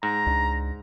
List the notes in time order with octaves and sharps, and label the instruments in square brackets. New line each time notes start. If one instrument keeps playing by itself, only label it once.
[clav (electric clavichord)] G#2 [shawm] A#5
[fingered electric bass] C#2 D4